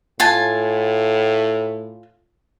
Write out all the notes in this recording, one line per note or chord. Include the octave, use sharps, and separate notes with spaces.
A2 F4 G#5 A5